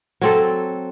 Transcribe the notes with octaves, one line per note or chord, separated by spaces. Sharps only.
F#3 C4 A4